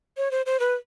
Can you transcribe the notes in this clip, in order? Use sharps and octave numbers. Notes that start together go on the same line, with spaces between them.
C#5
C5
C5
B4